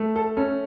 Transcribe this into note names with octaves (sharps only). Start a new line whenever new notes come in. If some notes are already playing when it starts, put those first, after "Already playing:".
Already playing: A3
A4
C#4 A4